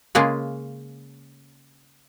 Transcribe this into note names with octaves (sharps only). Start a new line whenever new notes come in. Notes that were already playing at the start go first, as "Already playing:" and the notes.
C#3 G#3 A#3 F4 G#4